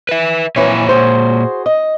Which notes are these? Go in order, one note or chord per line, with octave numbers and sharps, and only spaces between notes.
B4 E5
F2 A#2 E3 F#3 C#5
F#4 G#4 C5
D#5